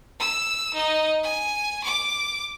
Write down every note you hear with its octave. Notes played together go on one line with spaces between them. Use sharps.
E6
D#4 D#5
G#5
D6